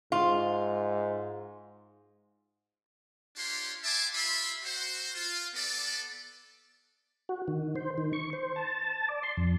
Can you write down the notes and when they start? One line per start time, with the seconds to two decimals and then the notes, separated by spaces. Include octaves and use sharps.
0.12 G#2 F4
3.37 D4 F4 G4 C#5 F5 C6
3.84 E5 F#5 G#5 A5 C6 D6
4.14 F4 G4 E5 B5 C6
4.64 F#4 C5
5.15 F4
5.54 B3 A4 D5
7.29 F#4
7.48 D#3
7.76 C5
7.98 D#3
8.13 C#6
8.33 C5
8.56 A5
9.09 D5
9.23 C6
9.37 F2